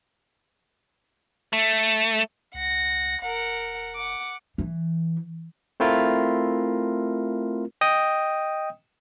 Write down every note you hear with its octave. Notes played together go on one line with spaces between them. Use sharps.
A3
C#2 F#5 A#6
E1 A#4 F#5
F#5 D6
E3
A3 C4 E4 F4 A#4
D#5 G5 D#6